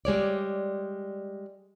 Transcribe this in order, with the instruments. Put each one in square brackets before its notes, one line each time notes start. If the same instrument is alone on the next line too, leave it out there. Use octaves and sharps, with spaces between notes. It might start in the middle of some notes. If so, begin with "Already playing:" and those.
[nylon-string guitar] G3 G#3 C#5 D5